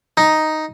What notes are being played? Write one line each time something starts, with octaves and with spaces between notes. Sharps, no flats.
D#4